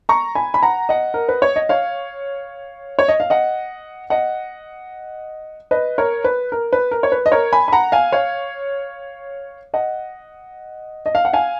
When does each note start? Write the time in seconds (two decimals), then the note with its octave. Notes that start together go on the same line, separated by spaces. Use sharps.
0.09 A#5 C#6
0.35 G#5 B5
0.54 B5
0.63 F#5 A#5
0.89 D#5 F#5
1.14 A#4
1.29 B4
1.42 C#5
1.56 D#5
1.69 C#5 F5
2.99 C#5
3.08 D#5
3.20 F5
3.30 D#5 F#5
4.10 D#5 F#5
5.71 B4 D#5
5.98 A#4 C#5
6.24 B4
6.52 A#4
6.73 B4
6.91 A#4
7.03 C#5
7.12 B4
7.26 D#5
7.32 A#4 C#5
7.53 G#5 B5
7.68 B5
7.73 F#5 A#5
7.92 F5 G#5
8.12 C#5 F5
9.74 D#5 F#5
11.06 D#5
11.15 F5
11.25 F#5
11.33 F5 G#5